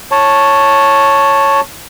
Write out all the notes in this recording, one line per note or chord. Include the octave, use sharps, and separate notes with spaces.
C#5 A5